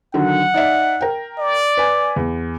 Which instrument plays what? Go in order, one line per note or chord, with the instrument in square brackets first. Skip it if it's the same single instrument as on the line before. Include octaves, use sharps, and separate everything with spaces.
[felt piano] D3 D#3 F#3 [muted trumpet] F#5
[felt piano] D#4 D5 E5
A#4 G5
[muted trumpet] D5
[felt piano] B4 G#5
E2